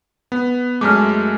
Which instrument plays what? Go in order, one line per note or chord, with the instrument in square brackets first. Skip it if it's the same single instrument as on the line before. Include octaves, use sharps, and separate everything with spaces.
[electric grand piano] B3
[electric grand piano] F#2 G#3 A3 [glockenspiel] D6 F6